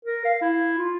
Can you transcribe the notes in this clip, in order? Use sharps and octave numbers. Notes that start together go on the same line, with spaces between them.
A#4
F5
E4
F4